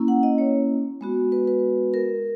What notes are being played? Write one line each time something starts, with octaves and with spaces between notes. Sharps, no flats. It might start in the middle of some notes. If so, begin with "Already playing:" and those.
Already playing: A#3 C#4 E4
F#5
D#5
C#5
G#3 B3 F#4
B4
B4
A#4